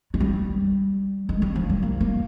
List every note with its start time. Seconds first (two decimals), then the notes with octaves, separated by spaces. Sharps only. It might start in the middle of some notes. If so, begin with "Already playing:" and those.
0.14 G#3
0.20 G3
1.29 G#3
1.42 G3
1.56 F3
1.70 G3
1.83 A#3
2.01 A#3